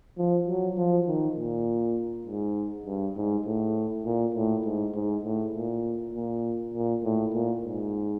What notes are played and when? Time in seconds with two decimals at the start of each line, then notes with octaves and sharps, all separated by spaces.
0.18 F3
0.48 F#3
0.77 F3
1.07 D#3
1.37 A#2
2.26 G#2
2.85 G2
3.16 G#2
3.46 A2
4.06 A#2
4.35 A2
4.65 G#2
4.95 G#2
5.25 A2
5.54 A#2
6.14 A#2
6.74 A#2
7.04 A2
7.34 A#2
7.63 G#2